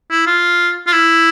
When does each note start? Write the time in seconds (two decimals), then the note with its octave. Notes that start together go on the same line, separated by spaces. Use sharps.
0.10 E4
0.26 F4
0.87 F4
0.92 E4